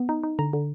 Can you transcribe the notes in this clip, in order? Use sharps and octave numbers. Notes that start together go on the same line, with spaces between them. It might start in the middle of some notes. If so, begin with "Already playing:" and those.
Already playing: B3
D#4
D#4
D3 A#5
D3